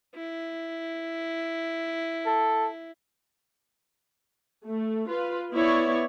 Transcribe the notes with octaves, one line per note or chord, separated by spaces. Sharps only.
E4
A4
A3
F4 B4
B3 E4 C#5 D5